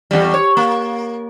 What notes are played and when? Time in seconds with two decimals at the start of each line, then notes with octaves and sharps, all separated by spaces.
0.11 E2 G3
0.34 C#5
0.57 A#3